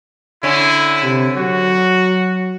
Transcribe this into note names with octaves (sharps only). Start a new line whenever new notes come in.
D3 C#4 E4
C3
F#3 F#4